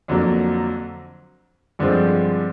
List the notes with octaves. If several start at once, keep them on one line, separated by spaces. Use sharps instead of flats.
F2 D3 F#3 A#3
G2 D3 F3 G#3 C4